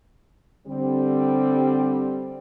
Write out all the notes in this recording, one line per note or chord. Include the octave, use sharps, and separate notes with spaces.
D3 G3 C4